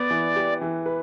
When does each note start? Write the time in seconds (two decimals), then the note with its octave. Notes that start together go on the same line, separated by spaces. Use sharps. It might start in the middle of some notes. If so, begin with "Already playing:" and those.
Already playing: B3 D5
0.11 E3
0.36 G4
0.61 E3
0.86 B4